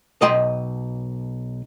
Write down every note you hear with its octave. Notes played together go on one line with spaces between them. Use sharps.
B1 D#5 G5 C6